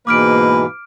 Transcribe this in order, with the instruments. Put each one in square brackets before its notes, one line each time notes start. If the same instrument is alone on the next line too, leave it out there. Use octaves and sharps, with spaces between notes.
[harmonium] G#2 B2 E3 [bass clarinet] A#3 [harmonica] B4 [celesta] D6 F6 D7